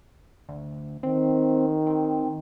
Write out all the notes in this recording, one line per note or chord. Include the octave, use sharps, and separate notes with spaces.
D2
D#3 C4
C4